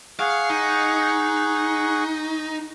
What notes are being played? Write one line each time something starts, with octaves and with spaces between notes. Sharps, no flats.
G#4 F5 F#5 C#6
D#4